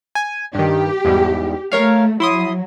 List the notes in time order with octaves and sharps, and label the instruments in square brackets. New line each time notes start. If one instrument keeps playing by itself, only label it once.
[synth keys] G#5
[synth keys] G2 D#3 [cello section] G4
[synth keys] E2 G#2 G3
[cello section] A3 [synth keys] A#4 C#5 F5
[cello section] F#3 [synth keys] E4 C6 D#6